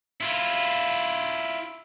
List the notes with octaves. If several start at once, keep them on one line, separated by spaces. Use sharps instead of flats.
E4 F4